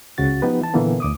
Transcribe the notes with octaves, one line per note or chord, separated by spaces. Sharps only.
C#2 C#3 F#4 A6
F3 B3 D#4 G4 B4
E3 A5
A#2 D3 E3 A#3 B3
D2 D6 D#6